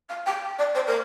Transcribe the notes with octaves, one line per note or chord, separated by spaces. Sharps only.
F5
G5
D5
C5
A#4